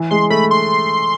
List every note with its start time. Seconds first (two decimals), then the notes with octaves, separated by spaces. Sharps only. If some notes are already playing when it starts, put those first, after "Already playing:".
Already playing: E3
0.11 G#3 C6
0.30 A3 B5
0.51 C6